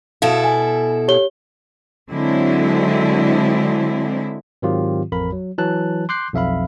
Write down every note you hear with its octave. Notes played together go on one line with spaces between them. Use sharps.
B2 E4 A4 F5
G#5
G4 C#5 G7
D3 F#3 G#3 C4 E4
G#2 D#3 F#3 C4 F4 G4
A1 F2 A#4 B5
F#3
E3 F#3 A5 F#6
C6 D6 F#6 G6 C7
B1 F2 E5 F5 B5